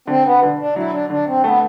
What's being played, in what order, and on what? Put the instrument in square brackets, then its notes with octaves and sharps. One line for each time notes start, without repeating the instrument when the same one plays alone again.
[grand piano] D3 [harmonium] C4
[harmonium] B3
[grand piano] D3
[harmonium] D4
[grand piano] F#3 [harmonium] E4
[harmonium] D4
[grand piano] D3 [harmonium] D4
[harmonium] C4
[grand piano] A3 [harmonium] B3